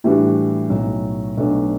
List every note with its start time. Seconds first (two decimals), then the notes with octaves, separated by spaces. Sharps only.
0.04 A2 E3 G3 D4 F#4
0.70 B1 A2 F#3
1.37 B1 B2 F#3 A3 D4